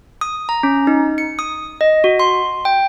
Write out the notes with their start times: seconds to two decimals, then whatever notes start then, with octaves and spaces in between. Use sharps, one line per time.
0.21 D#6
0.49 A#5
0.63 C#4
0.87 D#4
1.18 C#7
1.39 D#6
1.81 D#5
2.04 F#4
2.20 C6
2.65 G5